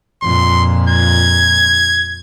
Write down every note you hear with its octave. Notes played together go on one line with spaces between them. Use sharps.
F2 A#2 C6
G#6